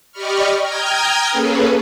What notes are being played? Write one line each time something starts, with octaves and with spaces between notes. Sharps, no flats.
G4 D5 D#5 B5 C#6 F6
G5 A#5 D#6 F6 G6 G#6
A#3 C#4 G#4 A4 B4